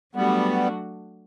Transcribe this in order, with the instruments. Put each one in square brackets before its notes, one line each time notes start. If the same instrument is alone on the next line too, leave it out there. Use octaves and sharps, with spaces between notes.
[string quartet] F#3 A3 D4 F#4 [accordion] G3 B3